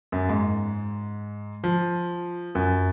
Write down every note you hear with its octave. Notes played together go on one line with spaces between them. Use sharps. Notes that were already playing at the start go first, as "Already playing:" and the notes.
F#2
G#2
F3
F#2